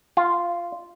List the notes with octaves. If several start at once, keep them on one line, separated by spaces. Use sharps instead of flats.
F4